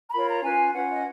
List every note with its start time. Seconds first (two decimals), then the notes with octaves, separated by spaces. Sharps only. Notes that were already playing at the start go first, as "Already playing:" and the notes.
0.09 A#5
0.13 F4 A#4 C#5 B5
0.29 A#5
0.43 C#4 F4 B4 G#5
0.74 C#4 F4 B4 F#5
0.92 D#5